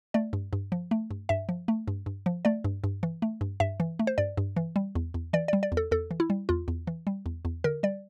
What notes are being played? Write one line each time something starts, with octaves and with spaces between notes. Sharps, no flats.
A3 D5
G2
G2
F3
A3
G2
G2 E5
F3
A3
G2
G2
F3
A3 D5
G2
G2
E3
A3
G2
G2 E5
E3
A3
C5
G2 D5
G2
E3
G3
E2
E2
E3 D5
G3 D5
D5
E2
A4
E2 A4
E3
E4
G3
E2 F4
E2
E3
G3
E2
E2
D3 A#4
G3 D5